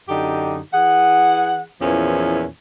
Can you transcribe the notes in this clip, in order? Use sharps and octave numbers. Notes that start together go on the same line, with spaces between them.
F#2 D3 D#4 G4
E3 G#4 F#5
E2 A#2 E3 F3 C#4